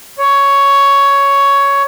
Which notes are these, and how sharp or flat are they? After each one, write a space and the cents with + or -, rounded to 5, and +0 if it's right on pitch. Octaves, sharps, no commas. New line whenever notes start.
C#5 +10